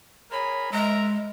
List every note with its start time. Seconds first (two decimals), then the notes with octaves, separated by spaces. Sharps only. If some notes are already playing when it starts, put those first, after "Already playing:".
0.32 G#4 A#4 C#5 B5
0.72 G#3 A#4 E5 A#5